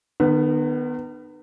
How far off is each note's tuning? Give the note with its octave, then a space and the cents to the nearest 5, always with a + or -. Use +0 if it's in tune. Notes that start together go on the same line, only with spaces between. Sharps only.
D#3 -40 B3 +0